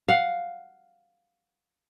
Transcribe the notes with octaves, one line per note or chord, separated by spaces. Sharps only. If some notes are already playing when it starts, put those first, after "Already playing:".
F5 F#5